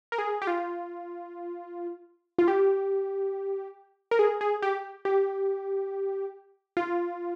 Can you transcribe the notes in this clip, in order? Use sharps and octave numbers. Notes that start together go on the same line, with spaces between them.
A#4
G#4
G4
F4
F4
G4
A#4
G#4
G#4
G4
G4
F4